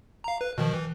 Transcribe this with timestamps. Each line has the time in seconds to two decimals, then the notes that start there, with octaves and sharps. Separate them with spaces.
0.24 F5 A#5
0.41 B4
0.58 B2 D#3 F3
0.73 E3